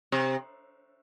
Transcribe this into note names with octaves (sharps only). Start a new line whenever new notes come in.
C3